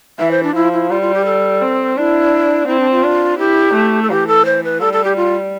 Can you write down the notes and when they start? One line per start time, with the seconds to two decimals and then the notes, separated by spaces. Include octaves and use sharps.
0.19 E3 E5
0.31 C5
0.43 D4
0.55 F3 E4
0.73 E4
0.90 G3 F4
1.02 F4
1.14 G4
1.25 A4
1.61 C4
1.97 D4 E4
2.67 C4 E4
2.80 D4
2.91 F4
3.03 D4
3.38 E4 G4
3.74 A3
4.03 A4
4.10 E3 G4
4.28 A4
4.45 C5
4.64 B4
4.81 G3 A4
4.93 A4
5.04 G4
5.16 F4